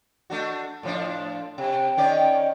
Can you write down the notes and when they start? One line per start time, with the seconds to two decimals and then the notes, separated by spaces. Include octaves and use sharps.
0.30 A3 D4 F#4
0.83 A2 F3 D4
1.58 C3 G5
1.97 D#3 C#4 D5